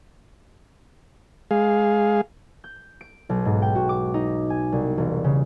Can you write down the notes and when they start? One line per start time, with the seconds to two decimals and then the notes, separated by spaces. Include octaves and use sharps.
1.51 G#3 G#4 F5
2.64 G6
3.01 D7
3.29 B1
3.45 G#2
3.62 G5
3.75 F#4
3.89 D6
4.14 D#4
4.50 G#5
4.72 C2
4.98 E1
5.24 C#3